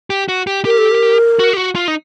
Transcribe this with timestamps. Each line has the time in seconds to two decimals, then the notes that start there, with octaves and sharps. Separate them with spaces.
0.10 G4
0.29 F#4
0.47 G4
0.65 G4 A#4
0.78 A4
0.91 A#4
1.39 F#4
1.53 G4
1.57 F#4
1.75 F4
1.88 D#4